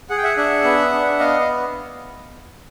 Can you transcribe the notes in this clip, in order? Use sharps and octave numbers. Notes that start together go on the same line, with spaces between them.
G#4 F#5
G5
E5 F#5
D4 E5 F#5
B3
D4
B3 D#5 F5
F5